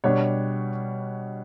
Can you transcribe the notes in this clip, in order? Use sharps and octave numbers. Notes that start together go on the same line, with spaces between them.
B2 G3 D4 C#5